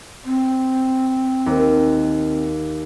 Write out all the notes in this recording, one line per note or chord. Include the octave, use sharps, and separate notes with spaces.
C4
D#2